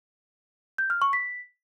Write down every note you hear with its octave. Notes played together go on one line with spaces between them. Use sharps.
G6
F6
C#6
B6